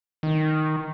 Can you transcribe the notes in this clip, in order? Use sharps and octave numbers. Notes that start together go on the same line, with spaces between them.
D#3